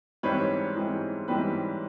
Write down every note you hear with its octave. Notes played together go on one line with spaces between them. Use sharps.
G#2 E3 G3 C4 B4 C#5
G#2 E3 G3 C4
G#2 E3 G3 C4 B4